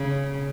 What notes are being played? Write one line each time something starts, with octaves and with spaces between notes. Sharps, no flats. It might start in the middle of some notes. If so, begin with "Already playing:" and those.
Already playing: C#3